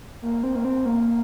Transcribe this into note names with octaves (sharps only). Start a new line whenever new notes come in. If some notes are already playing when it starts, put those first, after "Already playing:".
A#3
C4
A#3
C4
A#3